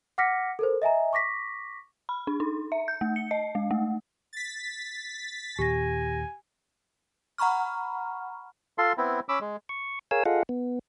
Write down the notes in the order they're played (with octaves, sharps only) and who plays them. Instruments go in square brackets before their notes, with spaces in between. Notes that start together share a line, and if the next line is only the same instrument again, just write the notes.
[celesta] F#5 D6 F6 A#6 B6 C#7
A4 A#4 C5
D#5 E5 G#5 A#5
C#6 D6 A#6 B6
[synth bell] B5
D4
D#4
E5
G6
A3
C#7
D#5
G#3
A3
[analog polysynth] A6 B6
[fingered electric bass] D#2 A#2 [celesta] G4 A#6 [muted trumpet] G#5
[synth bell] F#5 A#5 B5 C#6 F6
[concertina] F4 A4 C6
B3 C4 E4
C#4 B5 D6 E6
G#3
[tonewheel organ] C#6
G#4 A#4 C#5 F5 G#5 E6
F4 G#4 A4 D#5 F5 F#5
B3